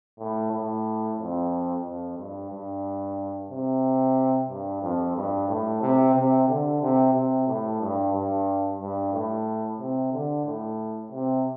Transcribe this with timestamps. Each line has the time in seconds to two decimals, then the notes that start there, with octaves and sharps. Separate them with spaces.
0.20 A2
0.52 A2
1.18 F2
1.85 F2
2.17 G2
2.51 G2
3.50 C3
4.50 G2
4.82 F2
5.16 G2
5.49 A2
5.82 C3
6.15 C3
6.48 D3
6.81 C3
7.14 C3
7.47 A2
7.81 G2
8.13 G2
8.80 G2
9.13 A2
9.79 C3
10.12 D3
10.46 A2
11.12 C3